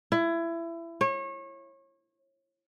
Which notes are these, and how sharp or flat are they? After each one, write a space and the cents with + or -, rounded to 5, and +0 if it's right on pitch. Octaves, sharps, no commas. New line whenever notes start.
E4 +25
C#5 -30